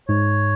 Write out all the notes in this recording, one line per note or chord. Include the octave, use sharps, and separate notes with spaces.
G#2 C#5